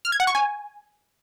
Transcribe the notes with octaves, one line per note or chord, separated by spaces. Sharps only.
F6
G#6
F#5
C#6
G#5